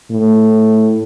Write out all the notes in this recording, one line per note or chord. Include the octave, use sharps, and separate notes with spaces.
A2